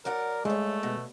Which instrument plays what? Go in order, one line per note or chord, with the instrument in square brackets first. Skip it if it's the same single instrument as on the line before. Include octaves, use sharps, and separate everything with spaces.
[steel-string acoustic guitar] F#3 D5 F#5 [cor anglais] A#4
[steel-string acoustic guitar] G2 C#5 [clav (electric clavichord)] G#3 [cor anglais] A3
[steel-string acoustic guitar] B2